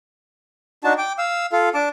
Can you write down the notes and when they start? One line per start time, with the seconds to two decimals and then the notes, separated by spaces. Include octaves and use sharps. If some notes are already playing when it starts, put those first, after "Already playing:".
0.84 D4 D#4 F#4 A5
0.98 G5 D6
1.18 F5 E6
1.52 F4 A4 F5
1.74 D4 A5 D6